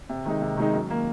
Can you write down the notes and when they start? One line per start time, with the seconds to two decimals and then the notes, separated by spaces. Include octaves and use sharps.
0.09 C3
0.25 D#3 G#3 D#4
0.42 C3
0.57 D#3 G#3 D#4
0.73 F#2
0.89 D#3 A#3